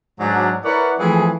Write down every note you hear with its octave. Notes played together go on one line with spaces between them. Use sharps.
G#2 F#3 D4
E4 A#4 B4 C#5 D5 F#5
E3 F3 A3 C4 G#4